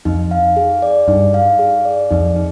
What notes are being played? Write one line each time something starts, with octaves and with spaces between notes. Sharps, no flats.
F2 D#4
F5
G#4
D5
G2 D#4
F5
G#4
D5
F2 D#4
D#4